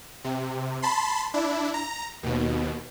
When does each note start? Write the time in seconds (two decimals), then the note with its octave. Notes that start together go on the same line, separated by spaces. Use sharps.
0.24 C3
0.82 A5 B5 C6
1.34 D4 E4
1.74 A#5
2.23 D#2 B2